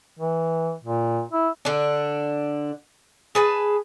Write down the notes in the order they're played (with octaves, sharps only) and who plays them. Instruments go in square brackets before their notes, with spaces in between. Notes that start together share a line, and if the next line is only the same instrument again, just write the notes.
[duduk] E3
A#2
E4
[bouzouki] D3 D4
G#4 B4 A5